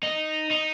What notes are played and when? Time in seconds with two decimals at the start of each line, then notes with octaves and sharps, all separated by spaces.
0.03 D#4
0.51 D#4